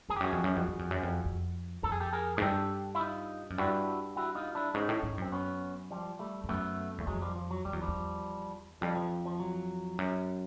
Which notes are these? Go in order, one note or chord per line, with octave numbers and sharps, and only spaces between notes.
F2 G#4
G4
F#2 F#4 G#4
F2
F#2
F2
F#2
F2
F#2
F2
F2
F2 A4
G#4
G4 A4
G#4 A#4
G#2 G#4
G2 G4 A4
E4
D#4 F4
F#2
G2 E4 F#4
E4 F#4
D#4 F4
D4 E4
G#2 C#4 D#4
A2
G#2
F#2 C4
B3 C#4
F3 G3
G3 A3
G2
F#2 A3 B3
E2 A3
F2 F#3 G#3
F3 G3
F3
F#3
F2 G3
E2 F#3
F3 G3
E2
F2 F3 G3
F3
F3
F#3
F#2